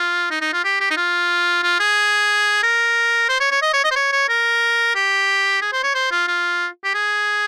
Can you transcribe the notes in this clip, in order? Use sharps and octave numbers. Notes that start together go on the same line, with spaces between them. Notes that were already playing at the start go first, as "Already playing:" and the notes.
Already playing: F4
D#4
D#4
F4
G4
G4
D#4
F4
F4
G#4
A#4
C5
C#5
C#5
D#5
C#5
D#5
C5
C#5
C#5
A#4
G4
G#4
C5
C#5
C5
F4
F4
G4
G#4